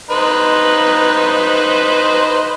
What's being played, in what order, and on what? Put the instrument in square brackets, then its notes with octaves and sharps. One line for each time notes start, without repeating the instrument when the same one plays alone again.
[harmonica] D#4 B4 C5